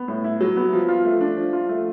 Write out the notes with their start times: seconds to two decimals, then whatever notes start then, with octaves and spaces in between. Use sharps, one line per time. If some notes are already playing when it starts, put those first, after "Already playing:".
Already playing: B3
0.08 A2
0.24 E4
0.41 F#3
0.56 B3
0.73 F3
0.89 F4
1.05 A3
1.21 D4
1.37 F3
1.53 F4
1.69 A3